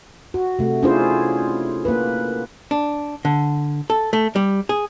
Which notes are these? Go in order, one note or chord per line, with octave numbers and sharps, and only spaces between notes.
F#4
C3 A3
C#4 D4 E4 F4 G#4 C5
A#3 B4
D4
D3
A4
A3
G3
G#4